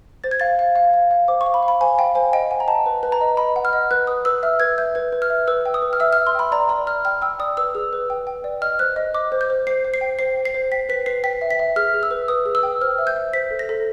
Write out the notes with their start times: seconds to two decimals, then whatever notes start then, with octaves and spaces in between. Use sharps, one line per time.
0.24 C5 A6
0.31 G#6
0.40 F5 A6
0.59 F5
0.76 F5
0.94 F5
1.11 F5
1.28 C5 D6
1.41 C#6
1.46 F5
1.54 B5
1.63 F5
1.68 B5
1.81 C5 G#5
1.98 F5 G5
2.15 C5 G#5
2.33 D#5 G5
2.51 F#5 G#5
2.60 A#5
2.68 D#5 A5
2.86 B4
3.03 B4
3.12 A#5
3.21 D#5
3.37 D#5 B5
3.56 F#5
3.65 F6
3.73 D#5
3.91 B4 F#6
4.07 B4 D#6
4.25 B4 E6
4.43 E5 F6
4.60 B4 G#6
4.78 E5 G6
4.95 B4 G#6
5.12 B4
5.22 F6
5.30 E5
5.47 B4 E6
5.66 G5
5.74 D#6
5.82 B4
5.93 F6
6.00 E5 E6
6.13 F6
6.17 E5
6.27 C6
6.35 G5 B5
6.52 D5 A#5
6.69 D5 B5
6.87 D5 F6
7.05 G5 F6
7.22 G5 E6
7.39 D5 D#6
7.57 B4 E6
7.75 G#4
7.93 B4
8.10 G5
8.27 G5
8.44 D5
8.61 D#5 F6
8.79 C5 F#6
8.96 D#5
9.14 D#5 D6
9.32 C5
9.41 G6
9.50 C5
9.67 C5 C7
9.84 C5
9.94 C7
10.01 G5
10.19 C5 C7
10.37 G5
10.45 C7
10.54 C5
10.72 G5 B6
10.89 B4 B6
11.06 B4 C7
11.24 G5 B6
11.41 E5
11.51 B6
11.59 E5
11.76 G#4 F6
11.94 G#4
12.03 E6
12.11 B4
12.28 B4 D#6
12.46 G#4
12.55 E6
12.63 G5
12.81 C5 F6
12.99 E5
13.07 G6
13.16 E5
13.33 C5 B6
13.51 A4
13.59 A#6
13.69 A4